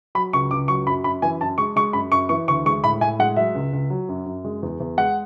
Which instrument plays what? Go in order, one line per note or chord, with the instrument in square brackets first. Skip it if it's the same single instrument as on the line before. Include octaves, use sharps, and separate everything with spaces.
[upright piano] F#3 B5
C#2 C#6
C#2 D6
F#3 C#6
F#2 B5
F#2 B5
E3 G#5
F#2 A5
G#3 C#6
G#3 C#6
F#2 B5
F#2 C#6
E3 C#6
D2 C#6
G#3 C#6
A2 B5
A2 G#5
G#3 F#5
F#3 E5
C#2
C#2
F#3
F#2
F#2
G#3
E2
E2
G#3 F#5